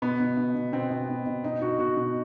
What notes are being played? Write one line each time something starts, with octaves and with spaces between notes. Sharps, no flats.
B2 B3
B2
B2
B2
B2 C4
B2
B2
B2
B2 D#4
B2 F#4
B2 F#4
B2